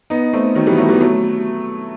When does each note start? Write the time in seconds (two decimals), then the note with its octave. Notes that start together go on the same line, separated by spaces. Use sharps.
0.10 B3 D#4
0.33 A3 C4
0.55 D#3 F#3
0.66 E3 G3
0.72 B3
0.77 F#3 A3
0.89 E3 G3
0.95 B3
1.01 F#3 A3